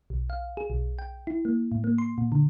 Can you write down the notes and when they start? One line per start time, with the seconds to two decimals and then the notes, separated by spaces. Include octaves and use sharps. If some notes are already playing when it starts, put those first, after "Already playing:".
0.10 B1
0.30 F5
0.57 G#4
0.70 B1
0.99 G5
1.27 E4
1.45 A#3
1.72 A2
1.84 A#3
1.98 C6
2.18 A#2
2.32 D3